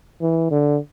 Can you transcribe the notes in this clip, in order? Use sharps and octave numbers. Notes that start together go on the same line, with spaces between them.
E3
D3